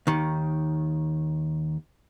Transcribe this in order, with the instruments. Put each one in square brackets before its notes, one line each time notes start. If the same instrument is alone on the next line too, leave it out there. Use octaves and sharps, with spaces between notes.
[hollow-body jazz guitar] D#2 D#3